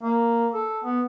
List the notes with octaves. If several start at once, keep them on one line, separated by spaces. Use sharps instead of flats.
A#3
A4
B3